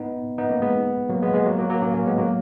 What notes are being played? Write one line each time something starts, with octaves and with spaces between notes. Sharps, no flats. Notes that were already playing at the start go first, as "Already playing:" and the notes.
Already playing: B3 D#4
B3 D#4
A#3 C#4
G#3 B3
F#3 A#3
G#3 B3
G#3 B3
F#3 A#3
F#3 A#3
F#3 A#3
A#3 C#4
A#3 C#4
G#3 B3
F#3 A#3